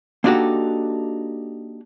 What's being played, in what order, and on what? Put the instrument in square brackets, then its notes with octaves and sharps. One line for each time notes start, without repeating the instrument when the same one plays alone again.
[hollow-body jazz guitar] A#3 D4 D#4 F#4 G4 A4